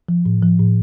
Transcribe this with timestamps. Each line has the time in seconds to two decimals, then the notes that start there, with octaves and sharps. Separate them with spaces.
0.09 F3
0.25 A2
0.42 F3
0.59 A2